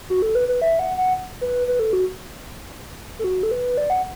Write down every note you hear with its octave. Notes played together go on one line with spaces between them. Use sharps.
F#4
A4
B4
B4
E5
F#5
F#5
B4
B4
A4
F#4
A4
F#4
A4
B4
D5
F#5